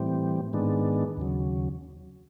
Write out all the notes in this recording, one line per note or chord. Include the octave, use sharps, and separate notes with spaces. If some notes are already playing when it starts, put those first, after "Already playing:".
Already playing: A2 E3 G3 C4
G#2 D#3 G#3 B3 D4
D#2 C#3 F#3